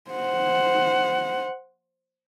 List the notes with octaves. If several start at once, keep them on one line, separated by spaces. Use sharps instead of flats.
C5 F#5